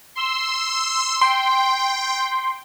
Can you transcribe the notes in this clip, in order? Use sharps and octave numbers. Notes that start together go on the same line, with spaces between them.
C6 E6
G5 C6